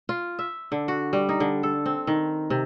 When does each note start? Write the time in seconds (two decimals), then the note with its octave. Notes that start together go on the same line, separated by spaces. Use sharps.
0.09 F4
0.39 E5
0.72 D3
0.88 F#4
1.13 G3
1.29 D#4
1.40 D3
1.63 A4
1.86 C4
2.07 D#3
2.50 C3